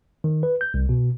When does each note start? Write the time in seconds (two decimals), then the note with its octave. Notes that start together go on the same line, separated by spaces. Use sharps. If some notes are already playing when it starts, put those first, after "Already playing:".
0.24 D#3
0.43 B4
0.61 G6
0.74 C2
0.89 B2